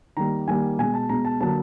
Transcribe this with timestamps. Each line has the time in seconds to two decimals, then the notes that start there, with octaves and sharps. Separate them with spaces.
0.17 D#3 G3 A#3 A#5
0.48 D#3 G3 A#3 G#5
0.78 B2 G#3 G#5
0.94 A5
1.09 B2 G#3 A#5
1.25 A5
1.41 D3 F#3 A#3 A5